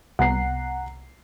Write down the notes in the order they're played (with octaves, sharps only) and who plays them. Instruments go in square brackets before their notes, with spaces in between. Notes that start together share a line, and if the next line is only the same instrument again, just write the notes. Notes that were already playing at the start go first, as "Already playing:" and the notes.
[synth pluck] C2 B3 [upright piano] F#5 A#5 C7